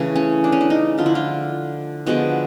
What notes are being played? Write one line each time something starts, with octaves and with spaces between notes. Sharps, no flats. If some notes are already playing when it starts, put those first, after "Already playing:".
Already playing: C#3 E3 A3
C#4
D4
C#4
D4
D#4
D3 F3 A3 F4
E4
F4
D3 F3 G#3 B3 F#4